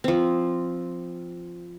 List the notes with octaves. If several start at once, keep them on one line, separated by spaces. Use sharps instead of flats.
F3 C4